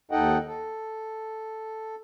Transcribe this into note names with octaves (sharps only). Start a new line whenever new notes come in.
D#2 D#4 A4 D#5 F#5 G5
A4